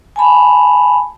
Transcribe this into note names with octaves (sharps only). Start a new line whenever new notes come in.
G#5 A5 B5